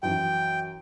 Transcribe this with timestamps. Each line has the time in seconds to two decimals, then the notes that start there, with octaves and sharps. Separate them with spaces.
0.03 F#2 E3 G5